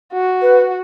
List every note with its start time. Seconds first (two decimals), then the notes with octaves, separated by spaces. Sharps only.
0.13 F#4
0.42 B4